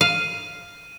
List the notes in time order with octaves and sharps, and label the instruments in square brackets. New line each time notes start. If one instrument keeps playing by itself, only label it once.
[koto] F5 [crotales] D#7